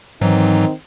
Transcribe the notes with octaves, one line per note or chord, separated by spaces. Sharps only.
G#2 D#3 E3 F#3 C4 D#4